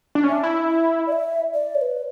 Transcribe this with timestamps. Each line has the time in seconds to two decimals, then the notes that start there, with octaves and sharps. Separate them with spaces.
0.15 D4
0.24 C#4
0.29 D4 E5
0.43 E4
0.70 E5
1.07 D5
1.12 E5
1.54 D5
1.75 C#5
1.81 B4